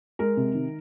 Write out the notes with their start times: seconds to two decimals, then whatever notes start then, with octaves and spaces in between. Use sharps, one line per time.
0.19 G#3 A#4
0.37 C3
0.54 D#3